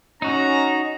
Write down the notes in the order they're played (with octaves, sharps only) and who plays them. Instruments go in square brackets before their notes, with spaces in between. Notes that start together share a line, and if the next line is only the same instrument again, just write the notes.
[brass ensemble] C#4 [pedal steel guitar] D#4 F#4 [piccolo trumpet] A#5